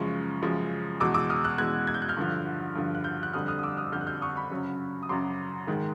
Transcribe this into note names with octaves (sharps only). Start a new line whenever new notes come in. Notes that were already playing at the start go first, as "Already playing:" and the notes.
Already playing: F#2 C#3 F3 G#3 C#6
F#2 C#3 F3 G#3
E2 B2 G#3 D6 E6
D6 E6
D#6 F6
E6 F#6
E2 B2 G#3 F#6 G#6
G#6
G6
F#6
F6 G6
G2 D3 F3
G2 D3 F3
F#6
F6 G6
F#6
F2 D3 G3 D#6 F6
D#6 F6
D#6
D6 E6
D#6 F6
F2 D3 G3 F6 G6
F#6
F6 G6
C#6 D#6
B5 C#6
F#2 C#3 F#3
D#6
F#2 C#3 F#3 C6 D6
G#2 D#3 G#3